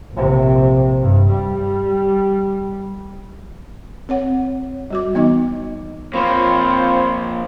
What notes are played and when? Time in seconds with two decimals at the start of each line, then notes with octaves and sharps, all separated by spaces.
0.13 A#1 C3
1.02 G2
1.33 G3
4.09 C4 C#5 F#5
4.91 G3 F#4 D6
5.14 E3 B3 D#4 D#5
6.14 F3 A#3 C4 F4 C5 C#5 F5 B5